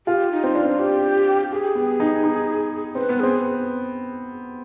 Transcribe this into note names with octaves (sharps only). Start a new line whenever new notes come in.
F4 G4
D#4
C4
D4 F4
C4
G4
G4 G#4
B3
D#4
D#4
C4 B4
B3
C4 G#4